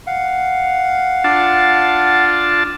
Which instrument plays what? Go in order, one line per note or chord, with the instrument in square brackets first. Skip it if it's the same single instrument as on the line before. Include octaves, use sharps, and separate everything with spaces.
[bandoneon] F5 F#5
[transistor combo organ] D4 F4 A5